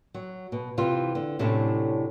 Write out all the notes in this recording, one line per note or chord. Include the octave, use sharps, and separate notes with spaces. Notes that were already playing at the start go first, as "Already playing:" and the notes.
F#3
B2
C3 E3 F4
D3
A2 C3 F#3 A3 C#4 D4